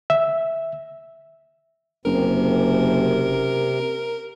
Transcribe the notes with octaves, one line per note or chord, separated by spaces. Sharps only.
E5
F#1 C3 A#4